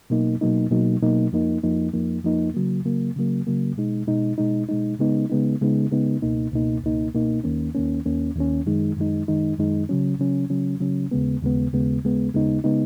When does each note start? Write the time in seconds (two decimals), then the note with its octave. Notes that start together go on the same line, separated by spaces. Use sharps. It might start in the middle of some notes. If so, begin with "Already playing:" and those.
0.10 B2 F#3 A#3 D#4
0.41 B2 F#3 A#3 D#4
0.71 B2 F#3 A#3 D#4
1.02 B2 F#3 A#3 D#4
1.32 F2 F3 A#3 D#4
1.63 F2 F3 A#3 D#4
1.93 F2 F3 A#3 D#4
2.24 F2 F3 A#3 D#4
2.54 C#3 F#3 A#3
2.85 C#3 F#3 A#3
3.16 C#3 F#3 A#3
3.47 C#3 F#3 A#3
3.77 B2 G#3 D#4
4.08 B2 G#3 D#4
4.38 B2 G#3 D#4
4.69 B2 G#3 D#4
4.99 C#3 G#3 B3 D#4
5.30 C#3 G#3 B3 D#4
5.61 C#3 G#3 B3 D#4
5.91 C#3 G#3 B3 D#4
6.22 C#2 B2 A#3 D#4
6.52 C#2 B2 A#3 D#4
6.83 C#2 B2 A#3 D#4
7.13 C#2 B2 A#3 D#4
7.44 D#2 D#3 A#3 C#4
7.75 D#2 D#3 A#3 C#4
8.06 D#2 D#3 A#3 C#4
8.36 D#2 D#3 A#3 C#4
8.66 F#2 D#3 G#3 D#4
8.97 F#2 D#3 G#3 D#4
9.28 F#2 D#3 G#3 D#4
9.58 F#2 D#3 G#3 D#4
9.89 C#3 F#3 C#4
10.19 C#3 F#3 C#4
10.50 C#3 F#3 C#4
10.80 C#3 F#3 C#4
11.11 D#2 C#3 G#3 B3
11.42 D#2 C#3 G#3 B3
11.73 D#2 C#3 G#3 B3
12.03 D#2 C#3 G#3 B3
12.34 D#2 C#3 G#3 B3 D#4
12.64 C#3 G#3 B3 D#4